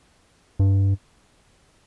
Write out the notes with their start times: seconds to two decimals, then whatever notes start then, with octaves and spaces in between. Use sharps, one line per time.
0.59 G2